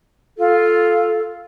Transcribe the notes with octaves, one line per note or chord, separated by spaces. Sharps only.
F4 A4